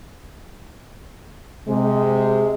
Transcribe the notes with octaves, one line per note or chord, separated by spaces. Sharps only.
C3 G#3